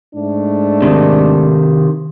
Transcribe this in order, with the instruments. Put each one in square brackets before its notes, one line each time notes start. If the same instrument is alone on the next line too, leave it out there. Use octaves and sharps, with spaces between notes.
[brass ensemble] G#2 A3 D4
[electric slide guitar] C3 D#3